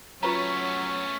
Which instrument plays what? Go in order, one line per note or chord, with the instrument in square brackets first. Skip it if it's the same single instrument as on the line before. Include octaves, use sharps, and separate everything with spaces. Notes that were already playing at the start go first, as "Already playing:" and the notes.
[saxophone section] F#3 [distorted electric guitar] A3 B3 [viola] C#4 [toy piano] F4 B4 A#5